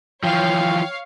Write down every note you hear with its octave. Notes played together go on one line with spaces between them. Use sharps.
E3 F3 C#5 F5 G5